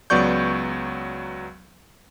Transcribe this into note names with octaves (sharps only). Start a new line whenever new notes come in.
C#2 F#3 B3 D5 C#6 G6